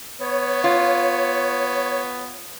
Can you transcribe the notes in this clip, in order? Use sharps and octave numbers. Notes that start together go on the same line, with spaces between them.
B3 C#5
F4